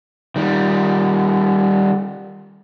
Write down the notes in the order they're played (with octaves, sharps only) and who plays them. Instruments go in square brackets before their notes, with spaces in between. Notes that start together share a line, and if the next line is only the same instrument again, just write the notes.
[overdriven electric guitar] D#3 G3